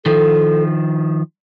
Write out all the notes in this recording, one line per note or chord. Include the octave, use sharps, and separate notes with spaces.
D#3 F3 A4